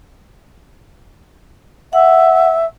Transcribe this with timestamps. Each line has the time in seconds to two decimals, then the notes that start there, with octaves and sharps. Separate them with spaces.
1.93 E5 F#5